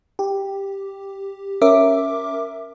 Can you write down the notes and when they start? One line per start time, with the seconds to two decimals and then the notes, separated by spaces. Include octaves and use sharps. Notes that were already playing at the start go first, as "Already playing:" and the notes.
0.19 G4
1.62 C#4 A#4 E5 D6